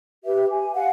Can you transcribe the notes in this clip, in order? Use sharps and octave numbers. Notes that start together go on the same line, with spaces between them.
G4 B4 E5
G#5
F5 F#5 G#5